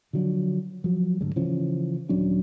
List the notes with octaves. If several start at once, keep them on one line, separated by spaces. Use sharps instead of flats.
D3 F3 F#3 D4
F3 F#3
D2 G#2 D3 G3
C#3 E3 F3 C#4
D#1 F#3 C#4 D4